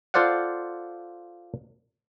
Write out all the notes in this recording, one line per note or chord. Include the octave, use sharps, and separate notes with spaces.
F4 A4 C5 D5 F5 F#5